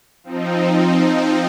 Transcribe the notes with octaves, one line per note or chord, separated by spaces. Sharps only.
F3 C4 D#4